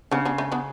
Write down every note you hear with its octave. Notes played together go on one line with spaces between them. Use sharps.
C#3 B3 D4
B3 D4
A3 C#4
B3 D4